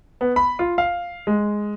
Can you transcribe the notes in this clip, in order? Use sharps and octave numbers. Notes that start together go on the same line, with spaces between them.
B3
B5
F4
F5
G#3